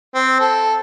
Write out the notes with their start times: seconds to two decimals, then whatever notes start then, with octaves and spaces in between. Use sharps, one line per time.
0.15 C4
0.41 A4